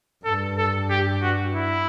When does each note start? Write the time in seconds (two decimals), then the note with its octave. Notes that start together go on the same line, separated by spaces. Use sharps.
0.25 G2 A4
0.58 A4
0.90 G4
1.22 F#4
1.54 E4